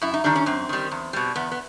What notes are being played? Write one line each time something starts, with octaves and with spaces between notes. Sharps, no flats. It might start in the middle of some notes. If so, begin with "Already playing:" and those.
F#2 E4
D#4
D#3 G3 D4
C#4
F#2 C4
D#3 G3
E2
B2 G3
E2 B3
B3